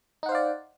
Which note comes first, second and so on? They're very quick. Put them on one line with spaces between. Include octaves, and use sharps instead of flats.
D#4 F#5 C5 F5 D5